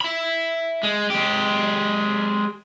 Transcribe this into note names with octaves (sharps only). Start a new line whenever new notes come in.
E5 B5
G#3
G#3 G4